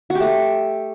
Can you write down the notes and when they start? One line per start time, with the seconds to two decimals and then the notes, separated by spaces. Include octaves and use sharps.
0.10 F#4
0.15 G4
0.20 A3